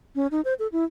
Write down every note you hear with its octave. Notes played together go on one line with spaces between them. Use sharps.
C#4
D#4
C5
A4
E4